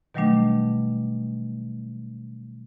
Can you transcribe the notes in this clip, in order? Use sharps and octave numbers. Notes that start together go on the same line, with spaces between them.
B2 D#3 F#3 G3 A3 D4